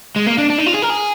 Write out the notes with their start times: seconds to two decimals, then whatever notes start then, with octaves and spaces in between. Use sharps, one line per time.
0.16 G#3
0.26 A#3
0.38 D4
0.50 D4
0.58 D#4
0.66 F4
0.74 G#4
0.82 A#4
0.90 G#4